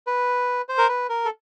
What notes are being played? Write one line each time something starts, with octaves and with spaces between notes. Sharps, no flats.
B4
C5
A#4
B4
A#4
A4